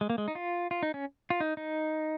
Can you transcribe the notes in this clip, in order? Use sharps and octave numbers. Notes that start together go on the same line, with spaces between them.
G#3
A#3
G#3
D#4
F4
F4
D#4
C#4
F4
D#4
D#4